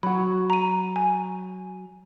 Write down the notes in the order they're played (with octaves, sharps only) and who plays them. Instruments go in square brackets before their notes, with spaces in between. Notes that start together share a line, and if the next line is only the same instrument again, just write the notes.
[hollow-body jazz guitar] F#3 F#4 [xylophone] B5
[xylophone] A#5 D#7
G#5